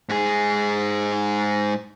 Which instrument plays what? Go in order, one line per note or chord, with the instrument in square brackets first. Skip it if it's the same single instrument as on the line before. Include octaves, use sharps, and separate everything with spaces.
[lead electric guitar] G#2 G#4